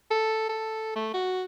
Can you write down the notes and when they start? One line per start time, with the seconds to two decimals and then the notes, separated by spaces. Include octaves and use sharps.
0.11 A4
0.49 A4
0.96 A3
1.14 F#4